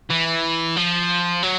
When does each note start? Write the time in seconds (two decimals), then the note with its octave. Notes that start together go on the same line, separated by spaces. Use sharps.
0.10 E3
0.77 F3
1.43 F#3